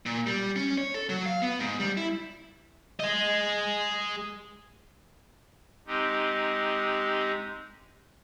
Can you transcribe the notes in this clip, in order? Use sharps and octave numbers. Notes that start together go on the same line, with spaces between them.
A#2
G3
C#4
C#5
A4
F#3
F5
B3
G#2
G3
E4
G#4 D#5
G#3 C4 D#4 G4